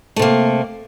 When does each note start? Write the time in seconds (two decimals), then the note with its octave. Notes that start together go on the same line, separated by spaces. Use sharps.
0.16 A3
0.19 C3
0.22 A#3